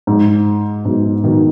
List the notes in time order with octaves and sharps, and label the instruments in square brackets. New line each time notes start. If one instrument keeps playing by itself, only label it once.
[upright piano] G#2
G#2 B2
B2 D#3